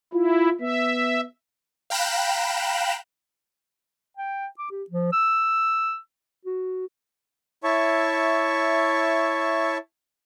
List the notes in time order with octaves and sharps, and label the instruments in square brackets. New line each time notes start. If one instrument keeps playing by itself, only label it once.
[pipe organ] E4 [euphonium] F4
[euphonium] B3 [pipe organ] E5
[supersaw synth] F5 G5 A#5 B5 F#6 E7
[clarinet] G5
D6
G4
F3
E6
F#4
[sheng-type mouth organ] E4 C#5 E5 A5 C#6